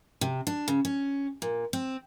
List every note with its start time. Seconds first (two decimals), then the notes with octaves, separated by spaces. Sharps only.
0.21 C3
0.47 D4
0.68 C#3
0.85 C#4
1.42 A#2
1.73 C4